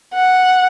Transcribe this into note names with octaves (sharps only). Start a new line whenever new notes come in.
F#5